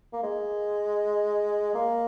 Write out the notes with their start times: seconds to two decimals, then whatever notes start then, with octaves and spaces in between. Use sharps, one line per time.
0.13 A#3
0.23 G#3
1.75 A#3